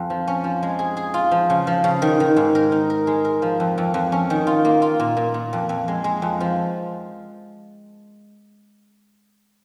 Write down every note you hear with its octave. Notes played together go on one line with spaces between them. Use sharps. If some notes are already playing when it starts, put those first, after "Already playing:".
Already playing: F2
F3
C#4
F3
G#3
G#4
G#4
F4
F3
C#3
F3
C#3
D#3
D#3
G#2
A#4
D#4
A#4
G#3
A#4
F3
F2
F2
F2
C#4
D#3
F4
A#3
F4
A#2
A#2
A#2
F2
F2
G#3
G#3
F2
F3